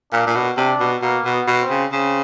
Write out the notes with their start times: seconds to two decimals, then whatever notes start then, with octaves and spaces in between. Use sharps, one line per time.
0.12 A#2 D4
0.27 A#2
0.35 B2
0.57 C3 D4
0.80 B2
1.02 B2 A#3
1.25 B2
1.33 B3
1.47 B2
1.62 C4
1.70 C#3
1.92 C#3 C4